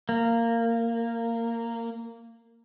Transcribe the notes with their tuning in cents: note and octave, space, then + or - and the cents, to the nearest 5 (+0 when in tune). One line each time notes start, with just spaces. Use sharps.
A#3 -15